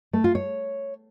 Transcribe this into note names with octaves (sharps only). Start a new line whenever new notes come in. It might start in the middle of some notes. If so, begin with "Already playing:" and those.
A3
F4
C#5